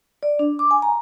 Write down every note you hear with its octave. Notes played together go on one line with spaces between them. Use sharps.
D5
D4
D6
G#5
A#5